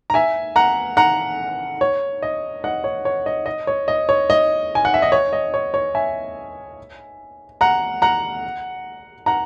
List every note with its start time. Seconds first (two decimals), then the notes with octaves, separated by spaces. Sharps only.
0.10 A#5
0.14 E5 G#5
0.56 F#5 A#5
0.97 F#5 A#5
1.81 C#5
2.22 D#5
2.64 D#5 F#5
2.84 C#5
3.05 C#5
3.26 D#5
3.46 D#5
3.67 C#5
3.88 D#5
4.09 C#5
4.30 D#5
4.75 G#5
4.85 F#5
4.94 E5
5.02 D#5
5.12 C#5
5.33 D#5
5.54 C#5
5.74 C#5
5.95 E5 G#5
7.61 F#5 A#5
8.02 F#5 A#5
9.26 F#5 A#5